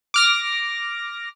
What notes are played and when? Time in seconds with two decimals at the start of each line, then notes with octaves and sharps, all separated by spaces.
0.14 D6 F6 A#6